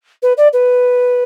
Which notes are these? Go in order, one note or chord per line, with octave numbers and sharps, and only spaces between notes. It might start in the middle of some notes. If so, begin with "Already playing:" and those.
B4
D5
B4